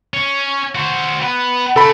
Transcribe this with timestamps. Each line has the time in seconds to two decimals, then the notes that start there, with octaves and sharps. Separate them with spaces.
0.14 C#4
0.75 F#4 C5
1.22 B3 B4
1.76 C#3 A4 B5